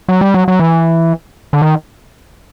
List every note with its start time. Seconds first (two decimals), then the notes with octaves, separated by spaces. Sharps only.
0.09 F#3
0.21 G3
0.34 F#3
0.48 F#3
0.59 E3
1.53 D3
1.62 D#3